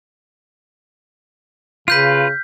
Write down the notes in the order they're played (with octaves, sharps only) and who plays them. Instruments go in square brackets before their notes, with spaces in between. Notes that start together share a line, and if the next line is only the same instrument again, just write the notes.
[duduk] C#3 [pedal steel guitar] F4 B4 [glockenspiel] F6 G6 B6